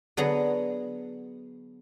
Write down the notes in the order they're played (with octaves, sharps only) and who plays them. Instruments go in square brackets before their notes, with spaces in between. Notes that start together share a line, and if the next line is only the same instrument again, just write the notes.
[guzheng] D3 F#3 B3 G#4 F#5 A#5